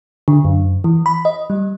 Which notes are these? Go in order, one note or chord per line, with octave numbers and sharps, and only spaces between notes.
D3
F#2
E3
B5
D#5
G3